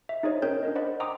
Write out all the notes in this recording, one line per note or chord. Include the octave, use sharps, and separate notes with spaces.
E5
D#4 G#4 C5 C#5 D#5
C#4 A#4 C#5 G5 G6
D4 A#4 D#5
C5 D5 D#5 F#5 B5
F#5 G5 A#5 C6 D6 D#6